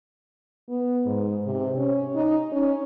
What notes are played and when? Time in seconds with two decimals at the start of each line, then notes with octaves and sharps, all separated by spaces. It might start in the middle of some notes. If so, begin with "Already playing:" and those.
0.69 B3
1.06 G#2
1.46 C3
1.77 C#4
2.16 D#4
2.52 C#4